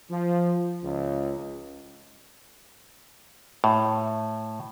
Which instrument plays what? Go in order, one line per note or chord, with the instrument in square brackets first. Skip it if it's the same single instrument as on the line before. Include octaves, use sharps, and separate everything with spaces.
[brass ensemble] F3
C#2
[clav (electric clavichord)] A2